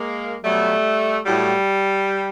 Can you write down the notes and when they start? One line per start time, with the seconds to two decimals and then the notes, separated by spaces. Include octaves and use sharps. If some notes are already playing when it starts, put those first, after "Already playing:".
Already playing: G#3 A#3
0.44 B2 F#3 G3 A3
1.26 A2 F#3 G3